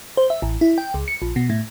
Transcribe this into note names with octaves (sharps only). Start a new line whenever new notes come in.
C5
E5
A1
E4
G5
C#2
C#7
A#1
B2
A2